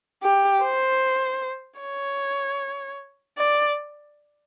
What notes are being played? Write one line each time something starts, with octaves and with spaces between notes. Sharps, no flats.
G4
C5
C#5
D5